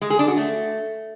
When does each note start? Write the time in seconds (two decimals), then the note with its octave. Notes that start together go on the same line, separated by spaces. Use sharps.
0.01 G#3
0.10 G#4
0.19 D4
0.28 F#4
0.37 A3